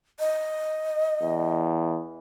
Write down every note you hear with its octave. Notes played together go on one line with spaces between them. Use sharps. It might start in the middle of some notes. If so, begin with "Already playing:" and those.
D#5
E2